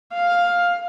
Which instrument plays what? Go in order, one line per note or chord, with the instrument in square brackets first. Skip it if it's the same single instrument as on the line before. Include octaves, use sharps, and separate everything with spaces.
[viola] F5